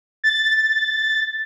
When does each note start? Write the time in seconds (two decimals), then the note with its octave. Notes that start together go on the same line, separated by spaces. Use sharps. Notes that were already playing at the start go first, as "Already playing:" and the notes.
0.24 A6